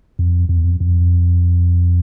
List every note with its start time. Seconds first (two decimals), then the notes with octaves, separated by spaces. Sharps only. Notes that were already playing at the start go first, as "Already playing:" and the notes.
0.19 F2
0.49 F2
0.57 E2
0.64 F2
0.80 F2